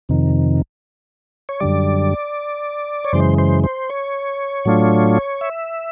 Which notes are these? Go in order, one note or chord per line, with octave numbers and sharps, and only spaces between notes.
F2 C3 D#3
C#5
F#2 D3 G3 D5
C#5
F#2 C#3 E3 G#3 C5
C5
C5
C#5
A2 F#3 A3 D4 F4
E5